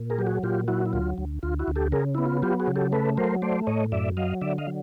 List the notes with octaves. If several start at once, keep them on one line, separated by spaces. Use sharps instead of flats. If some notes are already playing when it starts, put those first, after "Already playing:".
Already playing: A#2
G#4 A#4
F#3 G4
F#4 G#4
A#2 F4 G4
F#3 E4 F#4
E4
D2 F4
D2
D2 F4
E4 F#4
D2
G4 A4
C#3 G#4 A#4
B3 E4
F4
F#3 F4 G4
F#4 G#4
C#3
G4 A4
A3 A4 B4
F#3 A#4 C5
A3 C5 D5
A2 C#5 D#5
F#2 D5 E5
F#3 D#5 F5
D3 D5 E5
D#5 F5
F#3